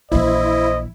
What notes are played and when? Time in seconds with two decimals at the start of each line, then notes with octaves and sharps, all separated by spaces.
0.12 A#1 E3 E4 C5 D#5